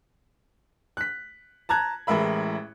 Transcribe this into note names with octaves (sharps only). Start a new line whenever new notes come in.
F#6 B6
A5 A#5 F#6 G#6
A1 A2 G#3 A#4 E5 B5